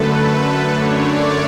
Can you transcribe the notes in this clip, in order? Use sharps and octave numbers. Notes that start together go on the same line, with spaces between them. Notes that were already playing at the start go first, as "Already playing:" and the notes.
Already playing: F#2 D3 A3 A4 B4
B4
F#2 D3 A3 D4 C#5
D5